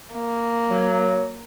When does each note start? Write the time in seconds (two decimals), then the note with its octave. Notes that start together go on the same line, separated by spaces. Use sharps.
0.13 A#3
0.70 F#3